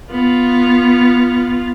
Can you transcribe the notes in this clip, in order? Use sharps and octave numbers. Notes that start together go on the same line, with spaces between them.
B3 F4